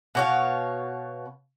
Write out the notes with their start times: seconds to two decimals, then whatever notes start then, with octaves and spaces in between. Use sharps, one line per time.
0.15 B2 C#5 F5